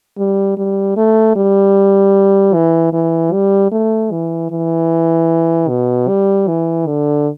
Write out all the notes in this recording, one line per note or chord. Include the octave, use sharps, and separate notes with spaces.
G3
G3
A3
G3
E3
E3
G3
A3
E3
E3
B2
G3
E3
D3